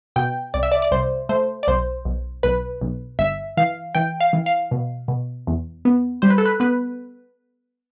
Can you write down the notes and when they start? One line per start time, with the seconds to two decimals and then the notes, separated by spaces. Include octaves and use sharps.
0.16 B2 G5
0.54 C2 D5
0.63 E5
0.72 D5
0.82 D5
0.91 C2 C5
1.29 A3 C5
1.63 D5
1.68 B1 C5
2.05 B1
2.43 B1 B4
2.81 B1
3.19 G1 E5
3.57 E3 F5
3.95 E3 G5
4.20 F5
4.33 E3
4.46 F5
4.71 B2
5.08 B2
5.47 E2
5.85 B3
6.22 G3 C5
6.30 B4
6.38 A4
6.45 B4
6.60 B3 B4